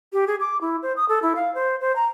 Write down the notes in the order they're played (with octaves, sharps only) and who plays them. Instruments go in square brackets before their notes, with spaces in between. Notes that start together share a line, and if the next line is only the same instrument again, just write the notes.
[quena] G4
G#4
D6
E4
C5
D#6
A4
E4
F5
C5
C5
A#5